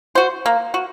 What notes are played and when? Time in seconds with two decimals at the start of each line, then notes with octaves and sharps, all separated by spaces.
0.15 F#4 C5
0.46 A#3
0.74 F#4